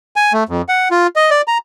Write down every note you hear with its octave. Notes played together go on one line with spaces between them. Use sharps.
G#5
A3
F2
F#5
F4
D#5
D5
A#5